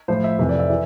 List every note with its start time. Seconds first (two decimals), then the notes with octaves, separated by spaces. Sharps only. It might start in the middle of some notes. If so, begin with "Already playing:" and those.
0.08 A2 F3 C5
0.24 E5
0.39 F2 C3 E3 E5
0.49 D5
0.59 E5
0.70 E3